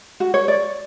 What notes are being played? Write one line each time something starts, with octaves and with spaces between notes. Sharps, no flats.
F#4
C#5
D5